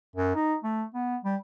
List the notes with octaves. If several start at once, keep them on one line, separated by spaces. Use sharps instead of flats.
F#2
D#4
A3
B3
G3